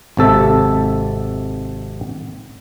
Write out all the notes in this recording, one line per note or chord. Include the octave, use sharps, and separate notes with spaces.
G#1 C3 A4 E5